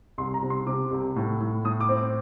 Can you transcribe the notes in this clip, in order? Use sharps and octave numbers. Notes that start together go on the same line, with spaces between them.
C2 C6
A#5
C3
C6
C3 D6
C2
A2
A2
A2 D#6
D6
C4
D6